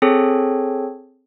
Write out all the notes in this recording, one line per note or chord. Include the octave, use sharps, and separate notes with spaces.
C4 G#4 A4 C#5